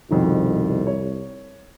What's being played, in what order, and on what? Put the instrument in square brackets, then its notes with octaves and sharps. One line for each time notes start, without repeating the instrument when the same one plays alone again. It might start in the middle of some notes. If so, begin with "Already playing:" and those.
[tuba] C2 [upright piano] F2 B2 D#3
[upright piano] C#5